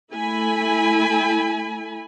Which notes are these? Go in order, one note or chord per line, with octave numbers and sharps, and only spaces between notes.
A3 E4 G#5 B5